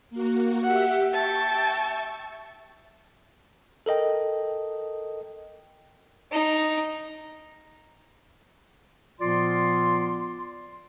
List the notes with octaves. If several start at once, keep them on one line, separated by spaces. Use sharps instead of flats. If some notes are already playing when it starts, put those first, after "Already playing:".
A#3 F#4
G4 E5 F#5
E5 G5 A5 C#6
A4 A#4 D#5 G5
D#4
A#2 F3 B3 F4 D5 C6